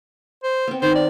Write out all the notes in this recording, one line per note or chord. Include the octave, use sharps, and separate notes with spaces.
C5
B3 C4
D#3 C5
D5